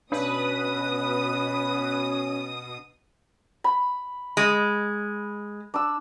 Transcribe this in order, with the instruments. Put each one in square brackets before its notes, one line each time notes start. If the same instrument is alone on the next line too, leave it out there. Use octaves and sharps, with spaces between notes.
[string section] B2 D#6 [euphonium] C#4 [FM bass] D4 [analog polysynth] B4
[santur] B5
[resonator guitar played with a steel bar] G#3
[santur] D4 E6